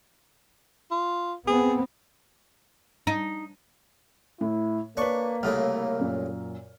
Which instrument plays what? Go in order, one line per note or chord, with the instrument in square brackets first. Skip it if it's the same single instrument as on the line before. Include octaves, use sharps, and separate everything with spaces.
[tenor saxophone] F4
[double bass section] B3 C4 [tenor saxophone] G#4
[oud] D#4
[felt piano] A2 [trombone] E4
[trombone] A#3 [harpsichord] D4 C#6 [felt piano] B4 C#5
[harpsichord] C2 A2 C#3 [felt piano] F6
[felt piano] F#2 A#2